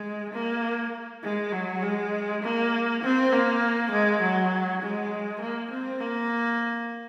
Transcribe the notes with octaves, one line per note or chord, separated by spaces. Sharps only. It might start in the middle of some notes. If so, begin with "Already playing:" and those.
Already playing: G#3
A#3
G#3
F#3
G#3
A#3
C4
A#3
G#3
F#3
G#3
A#3
C4
A#3